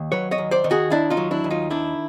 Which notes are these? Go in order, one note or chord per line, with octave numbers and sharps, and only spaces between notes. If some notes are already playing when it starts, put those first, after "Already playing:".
Already playing: D#2
F#3 B4 C#5
C#5 D#5
D#2
C5 D5
D#3
F#4 G#4
D#2 D4 E4
D#4 F4
F#3
D4 E4
D#2
D#4 F4
D#3 D4 E4